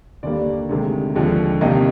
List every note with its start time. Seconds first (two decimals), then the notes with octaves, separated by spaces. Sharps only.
0.23 D#2 D3 G3 A#3 D5
0.69 D2 C3 D#3 G#3
1.15 D#2 D3 F3 G#3
1.61 C2 C3 D#3 A#3 D#5